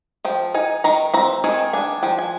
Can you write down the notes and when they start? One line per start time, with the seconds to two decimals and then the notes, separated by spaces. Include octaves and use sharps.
0.25 F3 G5
0.54 D#4 G#5
0.84 D#3 A#5
1.14 C4 A#5
1.44 D#3 G#5
1.73 D4 G#5
2.03 F3 G5
2.18 G#5